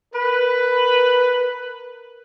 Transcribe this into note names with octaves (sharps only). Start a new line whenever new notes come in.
A#4 B4